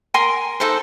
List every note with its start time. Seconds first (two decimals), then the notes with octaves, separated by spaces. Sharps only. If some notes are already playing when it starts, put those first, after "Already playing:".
0.14 A#4 G#5 A#5 C6
0.60 D#4 A4 B4 C5